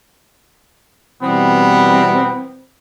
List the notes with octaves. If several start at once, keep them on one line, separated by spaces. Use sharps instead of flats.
B2 E3 G3 B3 C4